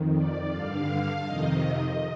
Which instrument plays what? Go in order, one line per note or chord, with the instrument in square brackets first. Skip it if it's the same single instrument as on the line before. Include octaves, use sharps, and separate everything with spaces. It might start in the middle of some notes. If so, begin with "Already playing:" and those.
Already playing: [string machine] F2 D#3
D5
G2 D3 F5
F2 C3 D#3 D#5